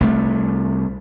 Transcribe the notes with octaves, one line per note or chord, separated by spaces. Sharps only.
C2 A3